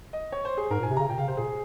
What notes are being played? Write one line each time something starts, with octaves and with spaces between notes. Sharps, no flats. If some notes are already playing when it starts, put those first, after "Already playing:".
D#5
C#5
C5
G#4
G#2 A#4
A#2
G#5
C3
C#3 A#5
A#2 G5
C#3 F5
C3 C5
A#2 G#4